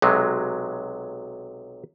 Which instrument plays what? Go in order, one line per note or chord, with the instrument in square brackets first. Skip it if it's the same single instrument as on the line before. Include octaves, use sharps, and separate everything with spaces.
[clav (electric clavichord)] B1 C3 F#3 G#3